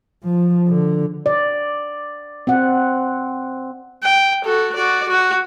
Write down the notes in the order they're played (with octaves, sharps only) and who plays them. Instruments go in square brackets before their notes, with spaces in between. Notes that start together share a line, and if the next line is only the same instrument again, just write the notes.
[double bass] F3
D3
[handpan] D5
C4 F#5
[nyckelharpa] G5
F#4 A4
F#4 D5
F#4